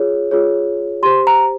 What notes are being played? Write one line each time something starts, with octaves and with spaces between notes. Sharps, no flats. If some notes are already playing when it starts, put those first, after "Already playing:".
Already playing: F4 G#4 C#5
F4 G#4 C#5
G4 C5 C6
A#5